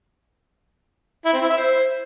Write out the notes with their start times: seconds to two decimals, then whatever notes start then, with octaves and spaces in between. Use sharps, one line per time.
1.25 E4
1.33 C4
1.41 E4
1.50 E5
1.58 C5